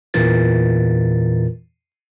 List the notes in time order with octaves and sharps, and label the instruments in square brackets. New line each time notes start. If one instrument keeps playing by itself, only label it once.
[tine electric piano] E2 A#2 E3 F4 A#4 A6